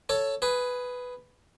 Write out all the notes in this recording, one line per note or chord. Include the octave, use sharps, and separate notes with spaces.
A4 C#5
G#4 B4